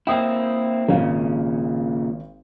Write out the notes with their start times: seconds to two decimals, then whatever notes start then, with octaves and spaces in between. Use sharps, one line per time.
0.07 A#3 C4 E4 G5 D#6
0.88 G#1 A#2 C#3 F5